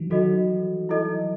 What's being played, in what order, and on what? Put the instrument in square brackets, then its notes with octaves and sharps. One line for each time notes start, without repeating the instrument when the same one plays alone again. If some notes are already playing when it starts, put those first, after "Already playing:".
Already playing: [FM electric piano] D#3 E3 F#3 G3
[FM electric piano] D#3 F#3 [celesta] F#4 A4 D#5
[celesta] E4 A4 D#5